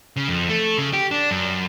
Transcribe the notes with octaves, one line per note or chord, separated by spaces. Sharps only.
C#3
F2
A3
C#3
G4
D4
F#2